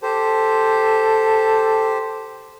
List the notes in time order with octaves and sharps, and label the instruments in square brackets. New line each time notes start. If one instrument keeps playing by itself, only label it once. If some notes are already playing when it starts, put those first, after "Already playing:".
[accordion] G4 C5 [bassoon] A4